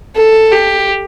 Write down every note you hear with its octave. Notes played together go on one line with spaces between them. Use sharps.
A4
G4